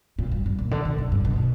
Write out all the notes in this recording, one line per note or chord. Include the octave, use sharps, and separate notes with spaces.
A#2
G2
G2
A#2
D3
B2
F#2
G2
B2